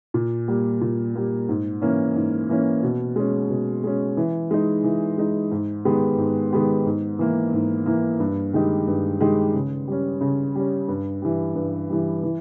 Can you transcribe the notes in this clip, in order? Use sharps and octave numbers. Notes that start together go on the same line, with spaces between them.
A#2
G3 A#3
A#2
G3 A#3
G#2
E3 A#3 C#4
G#2
E3 A#3 C#4
B2
G#3 C#4
B2
G#3 C#4
E3
G#3 D#4
E3
G#3 D#4
G#2
D#3 G#3 B3 G4
G#2
D#3 G#3 B3 G4
G#2
E3 A#3
G#2
E3 A#3
G2
D#3 G#3 D#4 G4
G2
D#3 G#3 D#4 G4
C#3
G3 C#4
C#3
G3 C#4
G2
E3 G3
G2
E3 G3
E3